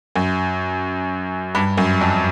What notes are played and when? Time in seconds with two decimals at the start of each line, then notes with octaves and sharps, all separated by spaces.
0.16 F#2
1.55 G2
1.78 F#2
2.01 F2